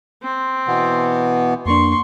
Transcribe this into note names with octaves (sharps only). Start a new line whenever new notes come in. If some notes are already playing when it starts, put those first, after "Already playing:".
C4
B2 E3 B3
F2 A#3 D4 C6 C#6